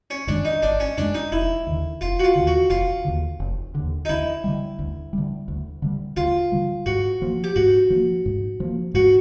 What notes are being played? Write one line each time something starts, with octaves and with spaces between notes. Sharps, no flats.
C#4
F#2 D#3 G#3 D4
D#4
G#1 D4
C#4
F#2 D#3 G#3 D4
D#4
F1 E4
D#2 D3
F1 F4
F#4
F4
D#2 D3
F#4
F1 F4
D#2 D3
F1
D#2 D3
D#4
D2 E4
D3 G3
D2
D3 G3
D2
D3 G3
D2 F4
D3 G3
G#2 F#4
F3 A#3
G4
G#2 F#4
F3 A#3
G#2
F3 A#3
G#2 F#4